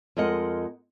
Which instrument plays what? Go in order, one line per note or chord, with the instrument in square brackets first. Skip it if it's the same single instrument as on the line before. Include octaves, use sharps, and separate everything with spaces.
[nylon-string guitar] F2 G#3 A#4 D#5 F#5